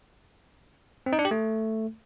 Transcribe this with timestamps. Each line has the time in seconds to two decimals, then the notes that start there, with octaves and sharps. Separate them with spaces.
1.06 C4
1.13 D#4
1.19 D4
1.25 G4
1.31 A3